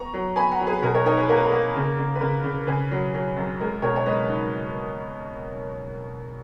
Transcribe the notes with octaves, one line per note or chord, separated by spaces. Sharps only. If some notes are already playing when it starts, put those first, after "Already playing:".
Already playing: B3 A#5 C#6
F#3
B3 G#5 B5
F#5 A#5
F#3
G#4 B4
B2 A#4
A#4 C#5
D#4 A#4 C#5
G#4 B4
A#3 A#4
B4
A#4
A#3
C#3
C#3
B4
C#3 A#4
C#3
C#3 G#4 B4
F#3
F#3
F#2
G#3 A#4
B2 A#4 C#5
C#5
G#3 B4 D#5
D#4